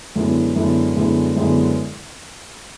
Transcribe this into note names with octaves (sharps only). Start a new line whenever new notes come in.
F#2 D3 G#3 B3 E4
F#2 D3 G#3 B3 E4
F#2 D3 G#3 B3 E4
F#2 D3 G#3 B3 E4